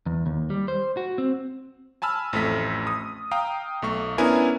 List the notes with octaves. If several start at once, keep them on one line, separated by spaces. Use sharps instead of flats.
E2
D#2
G3
C5
F#4
C4
G#5 A5 B5 E6 F6
A1 F2 A3 B6
D#6
F5 G5 A#5 D#6
B1 A3 C#6
B3 C#4 D4 E4 A#4 G#5